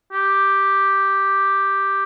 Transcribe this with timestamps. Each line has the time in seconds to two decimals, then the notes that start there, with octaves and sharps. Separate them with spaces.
0.12 G4